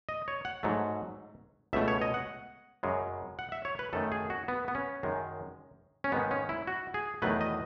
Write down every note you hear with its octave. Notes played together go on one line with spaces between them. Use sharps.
D#5
C#5
F#5
G#2 F#3 A3
C#2 B2 A3 E5
C#5
D#5
F#5
F#2 C#3 G#3
F#5
E5
C#5
B4
F#2 D#3 A3 A4
G#4
F#4
B3
B3
C#4
F#2 D#3 G#3
C#4
G#2 D#3 G#3 B3
C#4
E4
F#4
G#4
E2 D#3 F#3 A3 B4
D#5